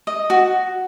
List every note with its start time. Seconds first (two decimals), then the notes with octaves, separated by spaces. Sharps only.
0.07 D#5
0.30 F#4